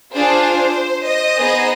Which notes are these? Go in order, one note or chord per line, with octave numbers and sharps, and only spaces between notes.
D4 F4 G#4 C5
C5 D#5
B3 D#4 G#4